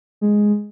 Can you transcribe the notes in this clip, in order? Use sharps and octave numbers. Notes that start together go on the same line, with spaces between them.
G#3